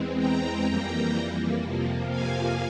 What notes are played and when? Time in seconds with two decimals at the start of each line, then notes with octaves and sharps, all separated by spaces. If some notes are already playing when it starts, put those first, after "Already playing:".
Already playing: E2 E3 G#3 C4
0.18 G5 A#5
0.66 F2 E3 G3 A#3
1.63 F2 C3 F3 A#3
2.11 F5 G#5